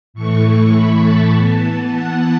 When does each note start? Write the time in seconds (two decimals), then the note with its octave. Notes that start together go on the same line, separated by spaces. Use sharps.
0.14 A2 E3 A3 C#6
0.73 B5
1.03 A5
1.32 E3 B3
1.92 F#5